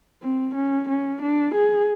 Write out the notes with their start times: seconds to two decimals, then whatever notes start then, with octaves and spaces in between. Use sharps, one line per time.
0.22 C4
0.54 C#4
0.89 C#4
1.22 D4
1.54 G#4